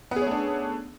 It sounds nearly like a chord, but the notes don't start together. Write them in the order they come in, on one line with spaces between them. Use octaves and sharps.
B3 G#4 C#4 A3 D4